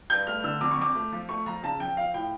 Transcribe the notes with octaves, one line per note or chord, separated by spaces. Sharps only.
G2 G6
A3 F6
D3 E6
F2 D6
C#6
F2 D6
A3
F3
A3 C#6
F3 A#5
C#3 A5
F3 G5
F3 F5
A2 G5